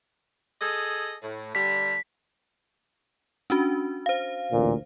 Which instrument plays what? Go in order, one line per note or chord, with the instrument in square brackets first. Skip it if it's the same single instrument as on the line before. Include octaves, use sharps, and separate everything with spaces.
[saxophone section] G#4 A4 D#5
A2
[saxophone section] D3 G3 [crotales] B6
[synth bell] C#4 D4 F#4
C5 F5
[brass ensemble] A1 D2 A#2